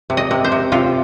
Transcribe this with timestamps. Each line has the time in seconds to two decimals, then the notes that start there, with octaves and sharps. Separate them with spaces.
0.10 C3
0.17 D#5
0.31 C3
0.44 C5
0.52 C3
0.72 C3 F4